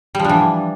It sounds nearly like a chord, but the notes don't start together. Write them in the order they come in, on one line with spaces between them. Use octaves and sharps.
G3 F3 D4 E3